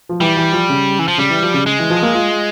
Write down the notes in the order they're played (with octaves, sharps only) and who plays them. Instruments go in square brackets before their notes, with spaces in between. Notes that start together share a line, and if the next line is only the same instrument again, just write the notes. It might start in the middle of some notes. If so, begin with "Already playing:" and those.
[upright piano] F3
[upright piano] E3 [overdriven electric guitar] G3
[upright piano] E3
F3
C#3
[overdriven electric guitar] E3
F3
[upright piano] C#3 [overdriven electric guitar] G3
[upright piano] E3
F3
C#3
[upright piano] C#3 [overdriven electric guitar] G#3
[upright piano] E3
F3
A#3
F4